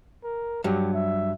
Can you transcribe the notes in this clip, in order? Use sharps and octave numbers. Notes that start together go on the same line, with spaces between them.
A#4
G2 F#3 G4
E5